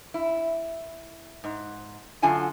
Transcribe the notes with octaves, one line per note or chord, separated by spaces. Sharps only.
E4
G#2
F#2 D3 F4 G#5 A5